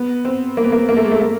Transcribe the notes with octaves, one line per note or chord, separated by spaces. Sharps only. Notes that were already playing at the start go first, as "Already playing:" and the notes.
Already playing: B3
C4
A#3
B3
A#3
A#3
A3
G#3
A3
A#3